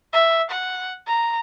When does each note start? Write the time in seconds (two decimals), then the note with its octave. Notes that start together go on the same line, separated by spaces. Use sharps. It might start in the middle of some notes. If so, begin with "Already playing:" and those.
0.13 E5
0.50 F#5
1.07 A#5